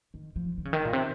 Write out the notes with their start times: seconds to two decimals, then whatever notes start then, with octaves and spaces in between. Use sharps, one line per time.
0.14 D#3
0.36 F3
0.58 D#3
0.65 C#3
0.73 D#3
0.85 A#2
0.93 C3